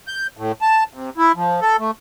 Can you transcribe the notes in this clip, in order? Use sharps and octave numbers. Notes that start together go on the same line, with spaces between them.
G6
A2
A5
C3
E4
F3
A4
A3